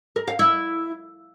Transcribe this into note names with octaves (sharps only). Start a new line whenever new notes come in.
A#4
F5
E4